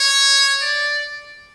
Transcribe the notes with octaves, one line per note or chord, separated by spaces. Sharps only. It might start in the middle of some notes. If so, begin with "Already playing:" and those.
Already playing: C#5
D5